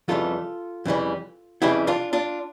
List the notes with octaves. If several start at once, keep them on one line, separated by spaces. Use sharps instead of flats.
F2 C#3 E3 G3 F4 A4
F2 C#3 E3 G3
F2 C#3 E3 G3 E4 G4
D4 F4
D4 F4